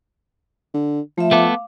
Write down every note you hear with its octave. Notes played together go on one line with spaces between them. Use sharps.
D3
F3 A3 E5
A3 B3 A4 F5 D6